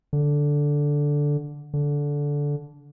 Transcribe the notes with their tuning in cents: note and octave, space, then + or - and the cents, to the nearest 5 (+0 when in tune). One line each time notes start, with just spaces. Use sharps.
D3 -5
D3 -15